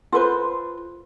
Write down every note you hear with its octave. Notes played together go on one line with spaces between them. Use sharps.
F4 A4 B4 C5